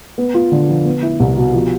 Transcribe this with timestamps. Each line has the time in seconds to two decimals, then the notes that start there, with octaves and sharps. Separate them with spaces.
0.18 B3
0.34 F4
0.52 D3
0.69 F3
0.85 B3
1.02 E4
1.20 C2
1.37 B2
1.54 F3